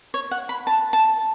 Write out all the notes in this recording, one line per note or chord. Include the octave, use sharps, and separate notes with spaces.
C#5
F#5
B5
A5
A5